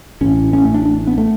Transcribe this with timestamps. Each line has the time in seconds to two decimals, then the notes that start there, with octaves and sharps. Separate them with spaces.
0.21 A1 A2 C#4
0.53 C#4
0.64 A3
0.74 D4
0.85 D4
1.07 B3
1.18 A3